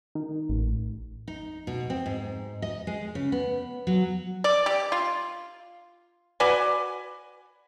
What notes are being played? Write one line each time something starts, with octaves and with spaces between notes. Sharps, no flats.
D#3
A1
D#4
B2
C4
G#2
D#5
G#3
C#3
B3
F#3
D5
G4
F4
F#4 B4 D5 G#5